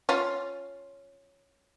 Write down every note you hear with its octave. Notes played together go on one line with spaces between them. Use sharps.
C#4 F4